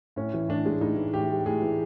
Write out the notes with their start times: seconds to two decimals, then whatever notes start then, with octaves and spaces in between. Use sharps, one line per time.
0.16 A2 C#4
0.34 E3
0.49 A2 D4
0.66 G#3
0.81 A2 D#4
0.97 E3
1.14 A2 G4
1.30 G#3
1.46 A2 G#4
1.62 E3